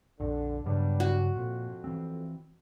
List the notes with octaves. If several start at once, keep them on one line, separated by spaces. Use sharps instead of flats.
A#1 F2 D3
G2 C#3 F#3 G3 B3 D4
F#4
F2 A#2
E3 C4